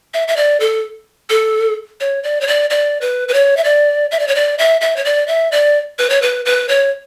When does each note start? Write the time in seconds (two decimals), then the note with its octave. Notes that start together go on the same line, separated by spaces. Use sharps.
0.14 E5
0.28 E5
0.36 D5
0.60 A4
1.30 A4
2.00 C#5
2.23 D5
2.41 C#5
2.48 D5
2.70 D5
3.01 B4
3.28 B4
3.34 C#5
3.57 E5
3.64 D5
4.11 E5
4.19 D5
4.28 C#5
4.35 D5
4.59 E5
4.81 E5
4.96 C#5
5.05 D5
5.28 E5
5.52 D5
5.98 B4
6.10 C#5
6.22 B4
6.45 B4
6.69 C#5